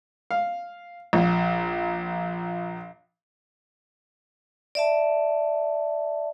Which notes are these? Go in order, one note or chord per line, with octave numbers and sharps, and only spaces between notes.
F5
A#1
D5 E5 A5